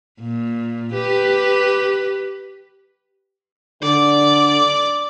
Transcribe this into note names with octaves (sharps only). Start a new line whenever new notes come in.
A#2
G4 B4
D3 D5